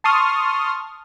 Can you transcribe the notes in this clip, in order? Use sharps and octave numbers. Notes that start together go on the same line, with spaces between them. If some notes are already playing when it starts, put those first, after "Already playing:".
A5 C6 C#6 D#6 F6